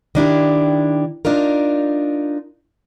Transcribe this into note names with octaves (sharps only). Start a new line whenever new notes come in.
D#3 D4 E4 G4
D4 D#4 F4 A#4